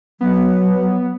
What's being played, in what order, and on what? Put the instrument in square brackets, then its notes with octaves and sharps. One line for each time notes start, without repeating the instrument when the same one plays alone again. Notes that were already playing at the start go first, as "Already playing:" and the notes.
[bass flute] F#3 [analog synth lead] B3